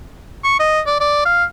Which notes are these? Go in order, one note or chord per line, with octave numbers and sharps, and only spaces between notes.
C#6
D#5
D5
D5
F5